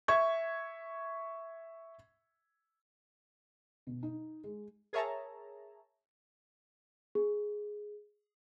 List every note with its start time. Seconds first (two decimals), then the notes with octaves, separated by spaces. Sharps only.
0.08 E5 C#6 G#6
3.87 B2
4.03 D#4
4.44 G#3
4.93 G#4 A#4 C#5 E5 A5 A#5
7.15 G#4